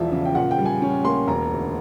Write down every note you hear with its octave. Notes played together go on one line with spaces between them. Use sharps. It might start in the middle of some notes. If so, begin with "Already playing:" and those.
Already playing: E1 E2 F3 D5 E5
C#3
G5
A#2 F#5
G5
G3
G#5
C#4
A#3 C6
E1 A#5
D2